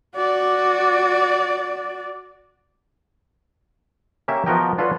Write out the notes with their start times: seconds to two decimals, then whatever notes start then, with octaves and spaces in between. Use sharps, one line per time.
0.15 F#4 D5
4.28 A#3 C#4 G4 E5
4.46 F3 B3 F#4 A#4 D#5 G5
4.78 D4 F4 F#4 A4 B4 C#5